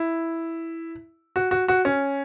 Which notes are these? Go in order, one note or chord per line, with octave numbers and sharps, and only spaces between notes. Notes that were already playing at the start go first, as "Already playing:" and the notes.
Already playing: E4
F#4
F#4
F#4
C#4